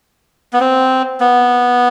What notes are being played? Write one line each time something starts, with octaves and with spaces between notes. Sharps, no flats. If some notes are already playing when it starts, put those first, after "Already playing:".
B3
C4
B3